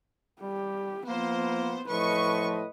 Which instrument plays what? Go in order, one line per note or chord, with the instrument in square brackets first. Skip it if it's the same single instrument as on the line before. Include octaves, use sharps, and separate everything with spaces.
[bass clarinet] G3 [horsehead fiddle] G4
[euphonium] F3 [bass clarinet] A#3 [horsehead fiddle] B3 [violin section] C5
[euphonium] A2 [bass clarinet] F3 [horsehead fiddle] B4 D#5 [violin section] C#6